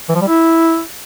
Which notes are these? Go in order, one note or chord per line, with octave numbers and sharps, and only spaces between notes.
E3
F3
G3
E4